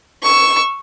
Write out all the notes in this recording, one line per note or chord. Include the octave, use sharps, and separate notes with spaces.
C#6 E6